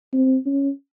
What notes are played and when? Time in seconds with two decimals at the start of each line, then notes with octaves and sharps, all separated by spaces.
0.13 C4
0.46 C#4